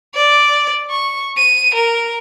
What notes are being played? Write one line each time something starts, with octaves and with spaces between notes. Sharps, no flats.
D5
C#6
D#7
A#4